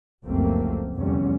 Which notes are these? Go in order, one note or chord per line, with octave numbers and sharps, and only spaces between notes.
F1 C#2 F#2 A3 A#3 C4
F1 E2 D3 G3 C#4